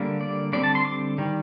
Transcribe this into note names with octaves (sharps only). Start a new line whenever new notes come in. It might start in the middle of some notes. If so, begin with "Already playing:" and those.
Already playing: D3 G3 A#3
D5
D3 G3 C4 D5
A5
C6
D6
D#3 G3